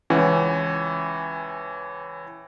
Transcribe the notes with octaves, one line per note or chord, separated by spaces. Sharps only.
C#2 E3 C#4 F#5